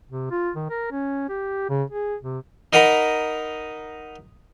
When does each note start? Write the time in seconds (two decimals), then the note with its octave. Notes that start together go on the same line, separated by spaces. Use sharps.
0.10 C3
0.31 F4
0.56 D#3
0.70 A#4
0.92 C#4
1.29 G4
1.69 C#3
1.90 G#4
2.23 C3
2.73 D#4 A#4 D#5 F#5 A#5 B5